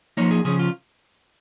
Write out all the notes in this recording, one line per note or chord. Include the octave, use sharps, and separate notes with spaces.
F3 A#3 D#4 C#5
G#4
C#3 F3 C#4 G#4
F4